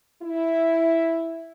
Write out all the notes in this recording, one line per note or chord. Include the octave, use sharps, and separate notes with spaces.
E4